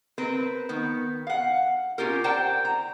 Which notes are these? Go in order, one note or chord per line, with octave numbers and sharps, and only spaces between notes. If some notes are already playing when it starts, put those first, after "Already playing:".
C4 A#4 B4
D#3 B3
F5 F#5
C#4 F4 G4 A#4
C5 D5 F#5 G5 A5 A#5
A#5